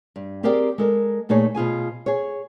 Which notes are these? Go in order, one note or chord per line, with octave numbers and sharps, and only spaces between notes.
G2
C4 G4 G#4 A#4 D5 G5
G#3 A4 A#4
A#2 A3 D#4 G#4 C#5
B2 F4 G#4 G#5
G#4 C#5